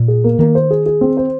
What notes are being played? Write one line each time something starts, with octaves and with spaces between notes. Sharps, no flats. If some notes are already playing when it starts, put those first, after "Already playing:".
Already playing: A#2
G#4
A#3
D#3 A#3
C5
G#4
G#4
C4
C5